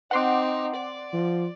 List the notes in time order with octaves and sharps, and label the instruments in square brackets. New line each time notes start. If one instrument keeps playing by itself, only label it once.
[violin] C4 D#4 [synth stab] F#5 C6 D6
[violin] D5
[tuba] F3